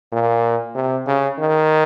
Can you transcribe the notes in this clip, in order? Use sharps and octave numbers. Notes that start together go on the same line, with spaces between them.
A#2
C3
C#3
D#3